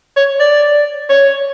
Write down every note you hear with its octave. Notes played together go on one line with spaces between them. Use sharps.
C#5
D5
C#5